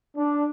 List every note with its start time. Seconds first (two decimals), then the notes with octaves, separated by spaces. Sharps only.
0.16 D4